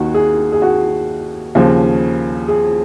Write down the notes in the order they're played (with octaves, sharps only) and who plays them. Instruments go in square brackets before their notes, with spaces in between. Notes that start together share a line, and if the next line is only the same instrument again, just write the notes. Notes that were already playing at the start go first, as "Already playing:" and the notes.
Already playing: [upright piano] D#2 D#3 F#4
G#4
G#4
F#4
D#2 C#3 F3
G#4